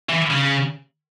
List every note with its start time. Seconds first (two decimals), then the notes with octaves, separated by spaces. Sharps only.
0.09 E3
0.30 C#3